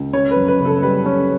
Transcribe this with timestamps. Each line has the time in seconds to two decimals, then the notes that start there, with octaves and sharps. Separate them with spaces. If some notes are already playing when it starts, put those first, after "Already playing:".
Already playing: C#2
0.13 C#4 C#5
0.31 B4
0.36 F#2
0.48 B4
0.60 C#3
0.65 A4
0.83 G3 B4
1.06 C#4